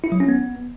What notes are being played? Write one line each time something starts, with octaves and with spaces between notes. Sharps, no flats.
E4
F#3
C#4
B3